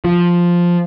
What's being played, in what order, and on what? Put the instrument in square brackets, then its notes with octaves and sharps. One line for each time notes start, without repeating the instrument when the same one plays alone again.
[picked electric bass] F3